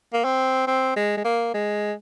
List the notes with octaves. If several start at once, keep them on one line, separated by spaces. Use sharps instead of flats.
A#3
C4
C4
G#3
G#3
A#3
G#3